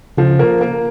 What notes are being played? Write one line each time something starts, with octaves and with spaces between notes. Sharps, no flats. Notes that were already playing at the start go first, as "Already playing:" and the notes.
C#3 F3
A#3
A#3